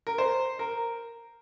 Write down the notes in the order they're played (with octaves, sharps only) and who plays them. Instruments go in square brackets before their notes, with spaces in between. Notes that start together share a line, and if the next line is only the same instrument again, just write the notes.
[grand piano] A#4
C5
A#4